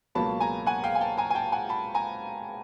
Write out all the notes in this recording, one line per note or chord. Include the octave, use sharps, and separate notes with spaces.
C#2 B2 F#3 A#3 A5 B5
G#5 A#5
F#5 G#5
F5 G5
G#5
G5 A5
G#5 A#5
G#5
G5 A5
F#5 G#5
A5 B5
G#5 A#5